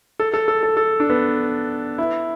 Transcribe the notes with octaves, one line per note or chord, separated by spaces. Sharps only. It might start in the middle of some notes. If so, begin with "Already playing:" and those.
A4
A4
A4
A4
A4
D4
B3
E4